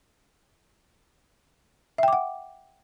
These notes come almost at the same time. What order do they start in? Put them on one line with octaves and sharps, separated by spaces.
E5 G5 D6 F#5